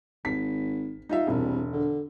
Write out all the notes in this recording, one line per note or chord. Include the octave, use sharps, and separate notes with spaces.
G#1 B6
D#4 F4 E5
E1 C2
D3